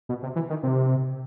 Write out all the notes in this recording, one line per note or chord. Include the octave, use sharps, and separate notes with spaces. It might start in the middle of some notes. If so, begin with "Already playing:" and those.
B2
C3
E3
D#3
C3